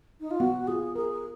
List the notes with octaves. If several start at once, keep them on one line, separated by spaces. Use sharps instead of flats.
D#4
F4
B3 F#4
F4 G#4
G#4 A#4